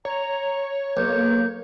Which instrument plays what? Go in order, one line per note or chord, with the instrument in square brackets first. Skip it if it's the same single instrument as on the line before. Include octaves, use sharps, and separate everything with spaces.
[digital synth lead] C#5 [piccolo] A#5
[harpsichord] B1 [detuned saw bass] A#3 [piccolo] G6